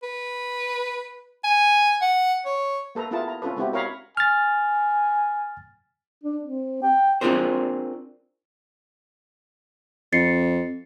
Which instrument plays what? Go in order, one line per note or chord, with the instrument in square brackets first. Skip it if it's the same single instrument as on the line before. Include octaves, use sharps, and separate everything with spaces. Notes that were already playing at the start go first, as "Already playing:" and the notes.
[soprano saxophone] B4
G#5
F#5
C#5
[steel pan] A#3 A4 B4 A#5
B3 E4 F4 G#4 A#4 A5
A#5
C4 C#4 F4 A4 B4
G#3 B3 C4 E4 F#4 G4
A#4 C#5 F5 A#5 B5
[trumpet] G#5 [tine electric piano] F6 A6
[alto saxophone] D4
C4
G5
[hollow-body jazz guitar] C4 D4 F4 G#4 A#4 C5
[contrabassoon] F2 [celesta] A6 C7 C#7